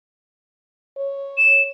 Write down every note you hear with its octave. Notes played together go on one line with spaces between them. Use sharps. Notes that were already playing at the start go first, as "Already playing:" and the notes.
C#5
E7